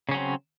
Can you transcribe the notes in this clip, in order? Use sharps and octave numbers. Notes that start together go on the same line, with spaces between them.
C#3 F#3 C4 C#4